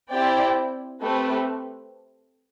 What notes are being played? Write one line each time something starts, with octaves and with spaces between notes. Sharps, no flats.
C4 E4 G4 D5 G5
A3 C4 G4 B4